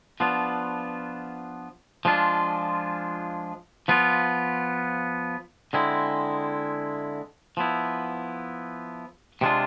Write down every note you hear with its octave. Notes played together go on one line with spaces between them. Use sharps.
F3 B3 D4 F4
F3 G#3 D4 F4
F3 B3 F4
D3 G#3 C4 E4
F3 B3 E4
C3 G#3 D4 F4